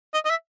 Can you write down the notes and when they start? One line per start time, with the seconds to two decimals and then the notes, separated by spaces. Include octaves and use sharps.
0.14 D#5
0.25 D#5
0.30 E5